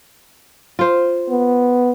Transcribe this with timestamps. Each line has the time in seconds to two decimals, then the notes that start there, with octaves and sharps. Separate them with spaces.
0.79 F4 C5
1.29 B3